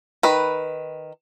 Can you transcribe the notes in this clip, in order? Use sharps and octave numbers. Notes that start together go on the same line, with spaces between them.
D#3 B4